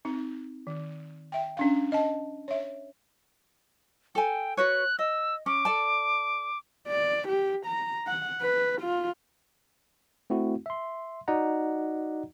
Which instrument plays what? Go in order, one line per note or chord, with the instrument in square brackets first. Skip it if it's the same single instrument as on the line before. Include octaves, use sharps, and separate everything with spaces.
[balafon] C4 D#4
D#3
E5 G5
C#4 D4 F5
D#5 A5
C#5 E5
[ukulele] A4 G#5 [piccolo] G5
[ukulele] F#4 B4 C#5 [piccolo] F#6
[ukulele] D#5 [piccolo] E6
[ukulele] C#4 [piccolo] D6
[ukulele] A4 D5 A5
[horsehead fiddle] D5
G4
A#5
F#5
B4
F4
[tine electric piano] A3 C4 E4 F#4
E5 C6
D#4 F#4 D5 D#5 F#5 A#5